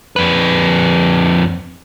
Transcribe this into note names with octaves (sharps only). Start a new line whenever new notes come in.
F2 B4